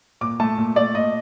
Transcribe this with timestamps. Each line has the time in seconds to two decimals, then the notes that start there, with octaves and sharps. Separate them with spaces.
0.21 A#2 D6
0.40 A3 A5
0.58 A#2
0.76 A3 D5
0.94 A#2 D#5